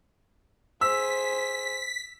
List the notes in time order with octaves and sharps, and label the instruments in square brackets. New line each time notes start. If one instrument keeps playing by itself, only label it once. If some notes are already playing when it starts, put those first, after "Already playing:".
[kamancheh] G#4 C5 [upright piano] E6 [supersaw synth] B6